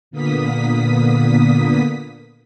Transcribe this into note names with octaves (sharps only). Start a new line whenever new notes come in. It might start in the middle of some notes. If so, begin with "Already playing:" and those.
A#2 D3 A#3 B3 D#6 B6